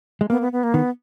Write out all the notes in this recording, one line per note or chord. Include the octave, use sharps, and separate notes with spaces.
G#3
A#3 B3
B3
B3
A#3
D#3 B3